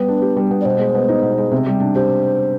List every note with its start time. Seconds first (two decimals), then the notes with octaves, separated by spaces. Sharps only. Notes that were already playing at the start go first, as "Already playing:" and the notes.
Already playing: G3 B3 B4
0.08 D4
0.22 G4
0.37 G3
0.51 B3
0.61 D5
0.65 B2 C5
0.79 G#3
0.95 B3
1.08 D#4
1.23 B2
1.38 G#3
1.51 C3
1.67 G3
1.80 D4
1.95 G4 C5